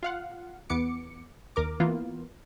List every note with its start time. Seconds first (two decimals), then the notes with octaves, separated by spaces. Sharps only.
0.03 F4 F5 F#5
0.70 E2 B3 D6 C#7
1.56 D#2 A#4 D6
1.80 E3 A#3 B3 F4